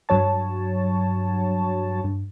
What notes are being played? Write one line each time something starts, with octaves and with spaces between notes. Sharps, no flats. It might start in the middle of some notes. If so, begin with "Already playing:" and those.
G2 F#3 C#5 A5
G2